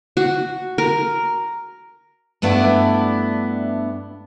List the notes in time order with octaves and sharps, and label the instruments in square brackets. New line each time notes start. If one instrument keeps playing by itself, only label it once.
[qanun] F#4
A#4
[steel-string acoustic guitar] G2 A3 B3 D4 E4 D5